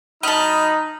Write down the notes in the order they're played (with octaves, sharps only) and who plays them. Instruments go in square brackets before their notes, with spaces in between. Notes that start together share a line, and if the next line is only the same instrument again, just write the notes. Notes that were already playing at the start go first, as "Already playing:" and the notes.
[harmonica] F#3 B5 F6 [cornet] D#4 [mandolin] D#5 A5